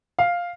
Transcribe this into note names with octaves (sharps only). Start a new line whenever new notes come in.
F5